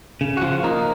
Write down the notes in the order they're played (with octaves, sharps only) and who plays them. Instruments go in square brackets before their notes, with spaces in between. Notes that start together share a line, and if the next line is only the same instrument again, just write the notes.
[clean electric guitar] C#3
F#4
F3 F4
A#3 D#4